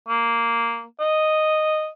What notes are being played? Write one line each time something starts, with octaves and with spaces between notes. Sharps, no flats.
A#3
D#5